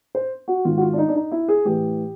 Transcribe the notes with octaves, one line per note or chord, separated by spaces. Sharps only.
C5
F#4
G#2 D#3 F4
F#4
F4
D4
D#4
D4
D#4
E4
G#4
A2 E3 G4